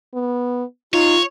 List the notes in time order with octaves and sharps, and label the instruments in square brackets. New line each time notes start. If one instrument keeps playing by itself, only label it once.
[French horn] B3
[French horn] D#4 [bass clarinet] F4 [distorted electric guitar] C#5